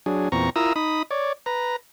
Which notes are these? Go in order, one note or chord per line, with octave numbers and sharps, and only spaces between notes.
F#3 D4 G#4
E2 A#2 C4 A#5 C#6
E4 F4 A#4 A#5 D#6 E6
D#4 B5 D#6
C#5 D5
B4 A#5